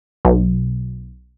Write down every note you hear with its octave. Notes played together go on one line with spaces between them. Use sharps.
B1